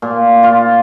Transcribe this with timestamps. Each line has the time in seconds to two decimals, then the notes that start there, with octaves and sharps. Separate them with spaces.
0.02 A#2
0.43 F4